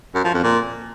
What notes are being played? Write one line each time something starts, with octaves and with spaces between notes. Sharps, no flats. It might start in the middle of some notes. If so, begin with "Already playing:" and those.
F#2
F3
F2
A#2